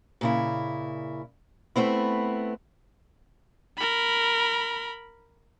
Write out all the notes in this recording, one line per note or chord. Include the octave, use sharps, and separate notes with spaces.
A#2 C#3 E4
A3 B3 C4 E4
A#4 B5